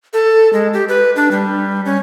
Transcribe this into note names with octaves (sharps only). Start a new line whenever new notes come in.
A4
G#3
G4
B4
D4
G3
C#4